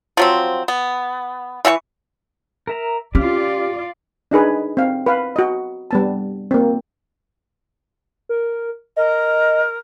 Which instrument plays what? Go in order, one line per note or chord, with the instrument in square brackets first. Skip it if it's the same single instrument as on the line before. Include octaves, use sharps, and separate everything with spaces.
[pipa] F3 F#3 C4
B3
E3 E5 F#5 C#6
[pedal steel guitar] A#4 E5 A#5
[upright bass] C#4 [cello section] F4 D5 [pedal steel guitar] G4 D6 F6
[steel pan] D4 D#4 G#4 B4
C4 F5
B4 F5
F#4 D#5
G3 B3 A5
A#3 C4
[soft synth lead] A#4
[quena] A#4 [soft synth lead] D#5